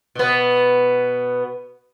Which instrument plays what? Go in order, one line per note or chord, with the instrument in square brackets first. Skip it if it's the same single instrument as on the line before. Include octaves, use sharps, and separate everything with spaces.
[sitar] B2 B3